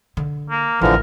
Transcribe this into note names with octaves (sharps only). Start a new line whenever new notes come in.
D3
A#3
A1 D3 E3 F3 A3 A#4